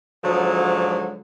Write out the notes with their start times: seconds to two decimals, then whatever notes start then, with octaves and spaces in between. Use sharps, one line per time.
0.24 G#2 D3 F3 F#3